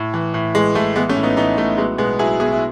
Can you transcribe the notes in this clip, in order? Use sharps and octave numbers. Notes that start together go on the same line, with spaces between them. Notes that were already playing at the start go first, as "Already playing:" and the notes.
Already playing: A2
E3
A2
E3 G#3
A2 A3
E3 G#3 B3
A3 C#4
A2
B3 D#4
E3 B3 D#4
A2 A3
F#3 G#3 B3
B2 G#3 B3
F#3 E4 G#4
B2 E4 G#4
E4